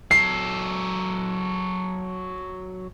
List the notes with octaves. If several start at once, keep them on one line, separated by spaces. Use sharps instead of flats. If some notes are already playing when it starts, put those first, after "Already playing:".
F#3 A4 C7